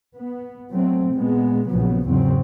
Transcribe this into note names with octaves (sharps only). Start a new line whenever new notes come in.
B3
F#3 A3 C4
A#2 G#3 B3
A#1 C#3 F3 F#3 B3
E2 G#2 C#3 F#3 C4